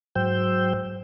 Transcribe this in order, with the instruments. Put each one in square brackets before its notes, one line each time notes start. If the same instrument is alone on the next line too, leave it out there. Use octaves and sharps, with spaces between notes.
[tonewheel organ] G#2 F#3 C5 G5 E6 G6